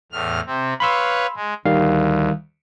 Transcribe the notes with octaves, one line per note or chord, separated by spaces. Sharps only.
E2 A2 F6
C3 C4
B4 C#5 F5 B5 C6 E6
G#3
D2 D#3 G3 F5